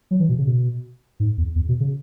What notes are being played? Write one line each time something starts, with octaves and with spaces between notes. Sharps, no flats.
F#3
E3
B2
C#3
B2
G#2
E2
E2
B2
C#3